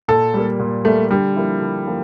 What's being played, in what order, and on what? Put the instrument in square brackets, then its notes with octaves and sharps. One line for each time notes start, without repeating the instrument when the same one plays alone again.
[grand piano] A#2 [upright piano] A4
[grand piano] G3 A#3
A#2
[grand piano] G3 A#3 [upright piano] A3
[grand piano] D3 [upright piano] G3
[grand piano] F3 A#3 E4
D3
F3 A#3